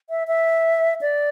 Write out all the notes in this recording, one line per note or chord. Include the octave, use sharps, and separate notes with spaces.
E5
E5
D5